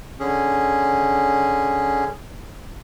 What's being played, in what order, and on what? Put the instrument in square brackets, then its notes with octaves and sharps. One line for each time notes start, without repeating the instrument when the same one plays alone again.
[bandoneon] D3 C#4 G#4